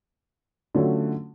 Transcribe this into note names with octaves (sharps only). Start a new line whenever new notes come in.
D3 F#3 A3 C#4 F4